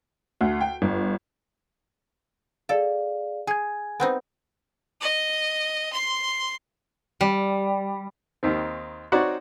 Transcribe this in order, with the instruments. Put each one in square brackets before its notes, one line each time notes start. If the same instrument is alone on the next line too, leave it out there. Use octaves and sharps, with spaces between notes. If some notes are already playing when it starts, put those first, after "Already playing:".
[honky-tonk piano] D2
G5
G1
[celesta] G#4 D5 F5 [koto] A4
[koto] G#4 [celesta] G#5 G#6
[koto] B3 C4 D#4
[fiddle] D#5
C6
[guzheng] G3
[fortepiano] D#2 D#3 C4
C4 D#4 F#4 C#5 D5 F#5